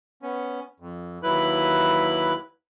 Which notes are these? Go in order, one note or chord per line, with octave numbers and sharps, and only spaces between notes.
B3 C#4
F2
D#2 F#3 E4 B4 F#6